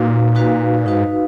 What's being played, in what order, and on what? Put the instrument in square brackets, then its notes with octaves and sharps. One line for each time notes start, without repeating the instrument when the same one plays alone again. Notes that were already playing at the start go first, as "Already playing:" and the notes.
Already playing: [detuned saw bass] A#2 [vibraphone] D#4 F#4 B4 F5
[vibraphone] D#4 F#4 B4 F5
[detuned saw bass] G#2 [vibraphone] D#4 F#4 B4 F5